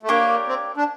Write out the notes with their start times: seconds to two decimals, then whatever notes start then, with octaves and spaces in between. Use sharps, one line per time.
0.03 A3
0.09 A#3 D4 G4 A#4 C#5
0.48 C4
0.77 D4